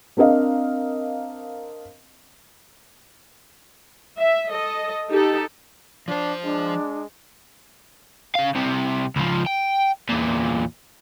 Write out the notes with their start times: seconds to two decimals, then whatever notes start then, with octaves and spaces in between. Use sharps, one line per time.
0.17 C4 D4 A#4 D#5 F5
4.17 E5
4.49 A4 D#5
5.10 D#4 G4 A4
6.08 F3 D4 C5
6.44 G#3 D4
8.35 C#3 F5
8.55 C2 C3
9.16 C#2 F3
9.47 G5
10.09 E2 A#2